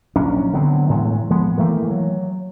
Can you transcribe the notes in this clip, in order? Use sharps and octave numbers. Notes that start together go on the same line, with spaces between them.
A#1 F#3 C#4 D4
D3 F#3 B3 C4
A2 E3 G#3 A3
F3 G#3 B3
D#3 E3 A3 A#3
F#3